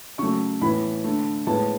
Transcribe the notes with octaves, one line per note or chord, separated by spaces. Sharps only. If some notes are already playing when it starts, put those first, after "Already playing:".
C#3 F#3 A3 C#6
A2 E3 B3 B5
D3 A3
A2 G#3 B3 A5